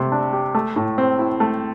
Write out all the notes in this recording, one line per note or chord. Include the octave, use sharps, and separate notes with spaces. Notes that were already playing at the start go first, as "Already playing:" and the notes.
Already playing: C3 A3
D4
G4
A3
A2
C4
E4
A3